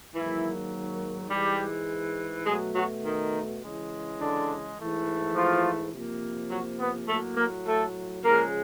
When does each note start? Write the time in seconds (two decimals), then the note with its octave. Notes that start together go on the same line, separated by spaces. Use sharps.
0.14 G#2 D#3 E3 F#3 A#3 E4
1.30 G#2 E3 G3 G#3 G4
2.45 B2 F#3 G#3 A3 G#4
2.74 F#3 F#4
3.04 D#3 D#4
3.62 C#3 E3 G#3
4.19 D3 D4
4.77 G#2 E3 A3
5.35 F3 F4
5.92 C3 F3 A#3
6.50 F#3 F#4
6.79 B3 B4
7.08 A2 F#3 A3 A#3 A4
7.37 A#3 A#4
7.66 A3 A4
8.23 C#3 F3 G#3 A#3 A#4